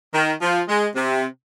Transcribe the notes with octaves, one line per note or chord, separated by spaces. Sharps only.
D#3
F3
G#3
C3